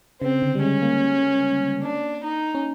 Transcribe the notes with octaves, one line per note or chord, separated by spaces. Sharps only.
C#3 C4
D3
G3
G#3 C#4
A#3
D4
D#4
C#4